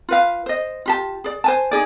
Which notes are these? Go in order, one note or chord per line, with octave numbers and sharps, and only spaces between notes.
F4 B4 F5
C5 D#5
F4 G4 A5
G#4 D5
C5 G#5 A5
D#4 G#4 D5